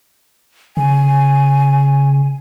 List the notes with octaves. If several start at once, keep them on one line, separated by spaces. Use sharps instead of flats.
C#3 G#5